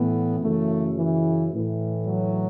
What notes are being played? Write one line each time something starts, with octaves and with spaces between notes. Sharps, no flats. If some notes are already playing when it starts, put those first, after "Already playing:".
Already playing: A2 E3 B3
F#2 C#3 E3 A3
E3
A2 E3
F#3